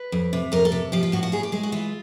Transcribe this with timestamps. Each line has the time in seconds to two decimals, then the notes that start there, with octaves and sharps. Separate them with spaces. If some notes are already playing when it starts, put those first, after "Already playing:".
Already playing: B4
0.12 F2
0.33 C3
0.52 F2 A#4
0.65 A4
0.72 C3
0.92 F3 G4
1.03 F4
1.12 A2 F#4
1.23 F#4
1.32 A2 G#4
1.43 G4
1.52 G#3 G#4
1.63 F#4
1.72 E3 F4